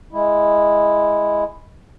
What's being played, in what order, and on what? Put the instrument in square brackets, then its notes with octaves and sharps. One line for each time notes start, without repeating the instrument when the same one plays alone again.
[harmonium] G#3 E4